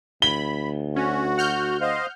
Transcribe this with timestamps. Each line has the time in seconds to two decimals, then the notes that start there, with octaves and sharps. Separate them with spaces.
0.22 D2 B5 G7
0.96 C#4 F#4
1.38 F#5 F6 G6
1.81 C5 D#5 F5